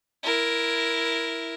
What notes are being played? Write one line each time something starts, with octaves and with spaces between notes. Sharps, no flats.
E4 A#4